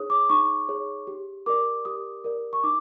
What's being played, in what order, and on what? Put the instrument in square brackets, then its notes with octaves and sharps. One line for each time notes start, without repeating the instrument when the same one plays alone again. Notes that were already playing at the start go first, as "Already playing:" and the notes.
Already playing: [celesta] D#4 G#4 C#5 D#6
D6
D#4 C#6
G#4 C#5
G4
A#4 D5 D6
G4 D#6
A#4 D5
C#6
D#4 D6